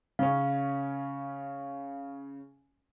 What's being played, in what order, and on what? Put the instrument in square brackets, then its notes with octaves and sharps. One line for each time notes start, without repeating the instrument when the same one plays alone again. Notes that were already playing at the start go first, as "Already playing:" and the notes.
[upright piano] C#3 C#4 [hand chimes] F5